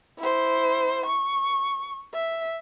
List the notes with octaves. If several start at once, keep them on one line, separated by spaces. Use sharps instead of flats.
E4 C5
C#6
E5